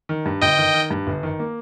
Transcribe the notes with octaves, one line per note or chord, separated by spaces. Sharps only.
D#3
G2
G1 D#5 G5
D#3
D#3
G2
G1
D#3
A#3